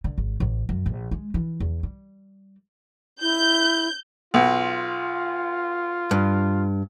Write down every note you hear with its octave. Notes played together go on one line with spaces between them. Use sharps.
D3
G#1
A1
F#2
A#1
G#3
E3
E2
G3
E4 G6
B1 F4
G2